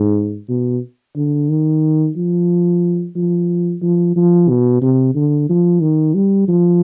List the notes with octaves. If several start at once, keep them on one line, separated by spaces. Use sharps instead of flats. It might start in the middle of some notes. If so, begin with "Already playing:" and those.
Already playing: G#2
B2
D3
D#3
F3
F3
F3
F3
B2
C3
D3
F3
D#3
G3
F3